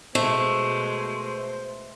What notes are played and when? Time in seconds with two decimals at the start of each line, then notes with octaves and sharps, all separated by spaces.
0.15 B2 G#3 A3 C5